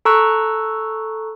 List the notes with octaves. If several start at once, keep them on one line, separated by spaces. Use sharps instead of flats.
A4 A#5 C#6 E6 F#6